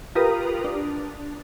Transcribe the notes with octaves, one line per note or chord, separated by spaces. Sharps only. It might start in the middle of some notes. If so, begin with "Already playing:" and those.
F4 G4 A#4 B4 A#5 D#6
D4